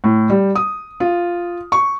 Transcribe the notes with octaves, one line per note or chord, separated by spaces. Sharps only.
A2
G3
D#6
F4
C#6